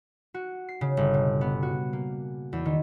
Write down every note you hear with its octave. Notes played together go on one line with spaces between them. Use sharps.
F#4
C7
C#3
G1
B2
B3
F#4
A#3
E2
D#3